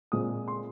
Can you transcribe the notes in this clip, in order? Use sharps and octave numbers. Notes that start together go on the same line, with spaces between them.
A#2 G#3 C4 D#6
C6